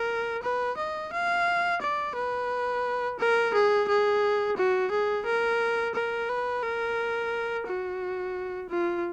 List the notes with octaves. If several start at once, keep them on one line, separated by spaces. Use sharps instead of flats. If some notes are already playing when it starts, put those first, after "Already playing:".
Already playing: A#4
B4
D#5
F5
D5
B4
A#4
G#4
G#4
F#4
G#4
A#4
A#4
B4
A#4
F#4
F4